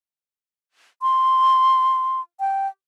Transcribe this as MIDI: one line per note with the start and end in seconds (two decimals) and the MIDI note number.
1.02 2.21 84
2.40 2.67 79